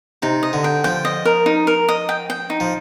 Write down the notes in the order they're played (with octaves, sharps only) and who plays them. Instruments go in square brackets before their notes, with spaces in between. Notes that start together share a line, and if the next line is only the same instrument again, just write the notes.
[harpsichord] C3 [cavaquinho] D#4
[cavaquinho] D#5
[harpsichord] D3
[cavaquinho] G5
[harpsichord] F3 [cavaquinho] G5
[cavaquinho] D#5
A#4
D#4
A#4
D#5
G5
G5
D#4
[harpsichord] F3